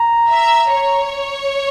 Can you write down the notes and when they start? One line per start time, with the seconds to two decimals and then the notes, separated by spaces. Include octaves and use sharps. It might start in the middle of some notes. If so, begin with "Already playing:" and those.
Already playing: A#5
0.29 E5
0.72 C#5